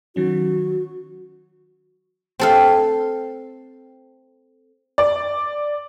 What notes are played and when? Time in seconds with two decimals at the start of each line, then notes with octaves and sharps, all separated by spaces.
0.16 D#3 F#3 C#4 F#4
2.40 C4 A4 F5
4.98 D5